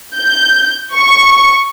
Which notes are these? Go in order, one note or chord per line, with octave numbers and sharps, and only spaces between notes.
G6
C#6